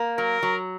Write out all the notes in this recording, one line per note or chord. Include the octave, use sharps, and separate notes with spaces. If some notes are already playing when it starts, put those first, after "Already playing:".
Already playing: A#3
F#3 A#4
F#3